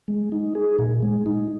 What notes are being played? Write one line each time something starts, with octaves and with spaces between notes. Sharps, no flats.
G#3
D#4
G#4
A#2
G#3
D#4